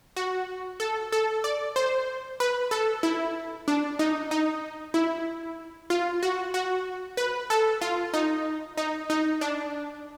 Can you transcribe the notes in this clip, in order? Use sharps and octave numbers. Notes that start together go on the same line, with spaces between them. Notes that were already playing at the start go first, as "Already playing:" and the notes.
F#4
A4
A4
D5
C5
B4
A4
E4
D4
D#4
D#4
E4
F4
F#4
F#4
B4
A4
F4
D#4
D#4
D#4
D4